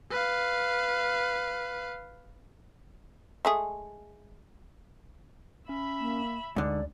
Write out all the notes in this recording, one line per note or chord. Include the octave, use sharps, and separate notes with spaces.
B4 F5
G#3 A3 G#4
C#4 E5 B5
A#3
D2 G#2 D3 D5